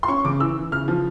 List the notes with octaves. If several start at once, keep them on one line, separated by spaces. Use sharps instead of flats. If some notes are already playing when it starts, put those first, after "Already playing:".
C6
C#4 C#6
C#3 D6
E3 E6
E3
C#3 F6
F3